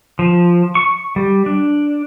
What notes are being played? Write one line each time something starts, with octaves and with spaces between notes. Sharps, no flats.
F3
C#6
G3
D4